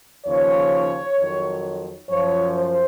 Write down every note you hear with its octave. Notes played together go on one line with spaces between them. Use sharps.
D#2 C#3 F3 C#5
F2 D#3 F#3
F#2 F3 C#5
C5